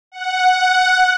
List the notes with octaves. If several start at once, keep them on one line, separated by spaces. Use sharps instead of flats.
F#5
F#5